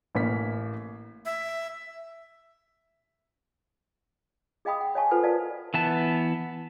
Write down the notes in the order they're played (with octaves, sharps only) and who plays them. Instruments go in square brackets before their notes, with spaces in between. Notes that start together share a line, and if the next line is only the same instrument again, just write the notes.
[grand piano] A1 A#3 B6
[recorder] E5
[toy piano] G#4 D#5 F5 G5 B5 D#6
F#5
C#5 D#5 F5 G#5 A5 C#6
F4 A4 B4 C5 F#5
A#4 D5 F5 A5
[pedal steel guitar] E3 B3 A5